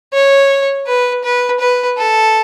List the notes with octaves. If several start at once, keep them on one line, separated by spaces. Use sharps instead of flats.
C#5
B4
B4
B4
A4